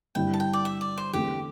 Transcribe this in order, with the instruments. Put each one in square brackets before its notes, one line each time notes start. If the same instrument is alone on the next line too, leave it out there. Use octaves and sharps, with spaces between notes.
[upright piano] G1 G2 G3 C4 E4 [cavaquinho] G5
[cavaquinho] A5
G5
D5
E5
D5
C5
[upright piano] E2 D3 A3 C4 [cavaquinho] G4